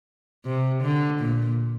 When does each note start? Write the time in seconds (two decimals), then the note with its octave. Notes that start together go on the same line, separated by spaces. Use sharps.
0.45 C3
0.83 D3
1.21 A#2